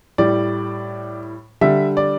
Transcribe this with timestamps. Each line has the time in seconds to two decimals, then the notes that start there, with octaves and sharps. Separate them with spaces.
0.18 A2 G3 D5
1.61 D3 G3 E5
1.97 D5